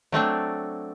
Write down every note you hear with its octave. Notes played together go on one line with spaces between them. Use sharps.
F#3 A3 C4 D4